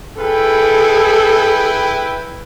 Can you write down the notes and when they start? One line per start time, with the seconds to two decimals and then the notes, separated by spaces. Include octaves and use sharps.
0.20 E4 G#4 A4 B4 G5